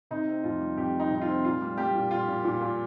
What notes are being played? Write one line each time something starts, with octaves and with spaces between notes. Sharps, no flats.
C3 D#4
C4
F2 F4
G3
F2 G4
G3
D#4
C3 D#4
F4
C4
A#2 F4
G3
G3 G4
A#2
A#2 F4
A#2
A#2
A#2